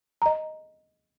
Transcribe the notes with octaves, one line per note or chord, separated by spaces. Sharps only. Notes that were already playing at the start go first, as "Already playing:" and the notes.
D#5 A#5